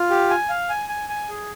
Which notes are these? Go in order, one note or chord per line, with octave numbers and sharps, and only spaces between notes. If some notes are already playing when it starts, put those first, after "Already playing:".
Already playing: F4
G4
G#5
F5
G#5
G#5
G#5
G#4